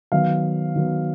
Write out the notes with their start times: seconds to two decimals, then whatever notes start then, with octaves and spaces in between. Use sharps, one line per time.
0.12 D#3 F#3 B3 F5
0.75 D#3 F#3 B3